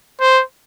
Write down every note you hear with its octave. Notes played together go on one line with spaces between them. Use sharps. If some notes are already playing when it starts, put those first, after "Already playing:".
C5